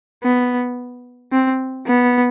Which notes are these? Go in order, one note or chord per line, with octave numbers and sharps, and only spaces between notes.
B3
C4
B3